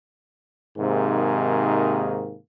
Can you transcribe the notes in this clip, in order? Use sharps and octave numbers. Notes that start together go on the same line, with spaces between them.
G#2 C3 D#3 A#3 G#4